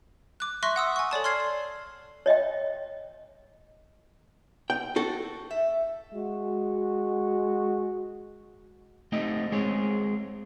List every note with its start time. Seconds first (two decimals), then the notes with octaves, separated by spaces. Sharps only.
0.40 D6 F#6
0.63 E5 C6 C#6 F#6 A#6
0.76 F#5 D#6 E6
0.96 G#5 C#6
1.11 A4 C#5 D5 A5
1.24 C6 F6 G#6 C7
2.26 C#5 D#5 E5 G5
4.70 G5
4.96 F#4 A4
5.51 E5
6.14 G#3 F#4
9.12 A3 C4 D#4 G4 D#5
9.52 G#3 C4 G#4 C#5